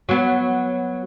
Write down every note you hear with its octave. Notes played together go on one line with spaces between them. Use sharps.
F#3 B3